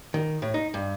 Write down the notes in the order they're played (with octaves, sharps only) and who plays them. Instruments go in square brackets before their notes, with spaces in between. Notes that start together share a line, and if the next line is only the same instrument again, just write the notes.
[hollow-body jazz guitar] D#3
A2
D#4
G2